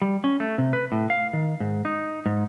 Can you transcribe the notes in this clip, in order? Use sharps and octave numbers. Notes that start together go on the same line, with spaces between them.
G3
C#4
A3
C3
B4
A2
F5
D#3
G#2
D#4
G#2